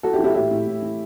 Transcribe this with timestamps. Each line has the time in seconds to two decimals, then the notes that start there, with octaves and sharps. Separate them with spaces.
0.03 E3 F#4 A4
0.13 E4 G4
0.19 E3
0.24 E4 G4
0.35 A2 E4 G4
0.51 A2
0.67 A2
0.82 E3